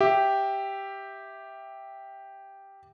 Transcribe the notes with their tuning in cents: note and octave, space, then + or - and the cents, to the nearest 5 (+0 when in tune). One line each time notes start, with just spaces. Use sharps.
G4 +0 E5 +0